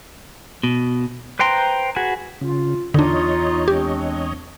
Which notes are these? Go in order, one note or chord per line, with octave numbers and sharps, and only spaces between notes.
B2
B4 C5 G5 A#5 C6
F#4 G#4 B4
C#3 F4
E2 D3 D4 D#4 F4 C#5 D#5
G#3 C4 D4 G4